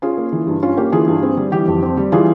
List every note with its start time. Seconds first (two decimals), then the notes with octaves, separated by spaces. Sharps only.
0.02 C#4 F4 G#4
0.18 A#3
0.32 E3
0.47 G2
0.63 C#4 F4
0.77 A#3 G4
0.92 E3 F4 G#4
1.08 G2
1.23 C4
1.37 G3
1.52 E3 G4
1.67 F2
1.83 C4
1.97 G3
2.12 E3 F4 G#4